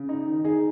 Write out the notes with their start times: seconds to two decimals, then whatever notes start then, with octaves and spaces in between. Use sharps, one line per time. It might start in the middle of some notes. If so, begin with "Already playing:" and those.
Already playing: C#3
0.09 D#4
0.27 D#3
0.45 D#4 G#4